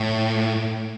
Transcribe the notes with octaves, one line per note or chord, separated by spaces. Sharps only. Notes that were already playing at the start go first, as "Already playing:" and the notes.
Already playing: A2